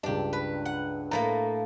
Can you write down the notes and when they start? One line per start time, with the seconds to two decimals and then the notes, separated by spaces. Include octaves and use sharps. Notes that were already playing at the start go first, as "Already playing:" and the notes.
0.03 C#2 G2 D4 G4
0.33 B4
0.65 F#5
1.11 A2 A3 A#3 A#5